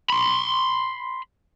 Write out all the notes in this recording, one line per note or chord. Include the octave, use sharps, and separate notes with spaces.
B5 C6